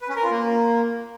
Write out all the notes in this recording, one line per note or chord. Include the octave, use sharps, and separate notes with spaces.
B4
C#4
A#4
F4
A#3